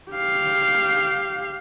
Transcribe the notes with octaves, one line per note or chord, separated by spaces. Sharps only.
G4 F5